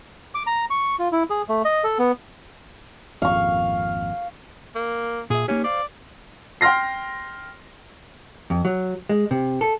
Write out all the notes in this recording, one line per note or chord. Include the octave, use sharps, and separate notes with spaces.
D6
A#5
C#6
F4
E4
G#4
A3
D#5
A4
B3
G#1 F2 A#2 F5 C#6
A#3
A#2 G#4 E5
A#3 C#4 D#4 G4
C5 D5 F5
G5 C6 F6 A#6 C7
F2
F#3
G#3
C3
A4